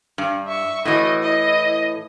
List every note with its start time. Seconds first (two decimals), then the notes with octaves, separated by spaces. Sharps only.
0.18 G2
0.47 E5 C#6
0.85 A2 E3 F#4 D#5
1.22 E4 D#5